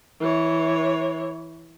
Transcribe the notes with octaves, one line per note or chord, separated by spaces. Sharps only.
E3 C#5